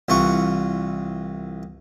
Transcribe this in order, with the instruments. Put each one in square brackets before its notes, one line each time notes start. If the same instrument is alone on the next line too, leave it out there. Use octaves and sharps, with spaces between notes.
[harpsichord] C2 E3 F4 F#5 C#6